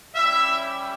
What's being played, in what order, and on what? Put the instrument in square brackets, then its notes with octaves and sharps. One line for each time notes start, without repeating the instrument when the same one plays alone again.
[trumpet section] G3 C#4 E4 G4 E5